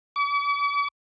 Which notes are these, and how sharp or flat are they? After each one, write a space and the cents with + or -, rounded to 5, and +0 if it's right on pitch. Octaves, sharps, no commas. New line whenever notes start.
D6 -45